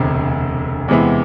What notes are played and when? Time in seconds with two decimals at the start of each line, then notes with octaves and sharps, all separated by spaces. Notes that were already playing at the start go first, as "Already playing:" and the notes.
Already playing: E1 D2 C3
0.88 E2 C3 G#3 B3 E4